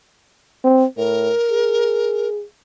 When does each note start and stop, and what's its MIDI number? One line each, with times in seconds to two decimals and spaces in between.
0.64 0.85 60
0.97 1.31 45
0.97 2.28 70
1.50 2.44 68